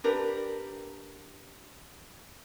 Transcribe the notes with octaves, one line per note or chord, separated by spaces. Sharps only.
D4 G4 A#4 B4